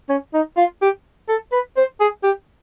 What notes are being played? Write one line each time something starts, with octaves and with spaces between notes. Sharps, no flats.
C#4
D#4
F4
G4
A4
B4
C5
G#4
G4